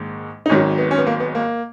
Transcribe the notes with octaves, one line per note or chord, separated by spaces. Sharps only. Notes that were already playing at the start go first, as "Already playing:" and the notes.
Already playing: A#1 G#2 D#3 G#3
D#4
G#1 G#2 D#3 F#3 C#4
B3
C#4
B3
A#3
B3
A#3